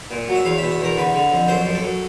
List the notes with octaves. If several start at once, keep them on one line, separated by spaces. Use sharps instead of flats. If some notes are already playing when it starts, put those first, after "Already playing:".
Already playing: E5
A#2
F#3
E5
E2 F5
E5
B2
E5
E2 A#4
D3 B4
D3
F2
F#2 C5
F#2
A4
F#2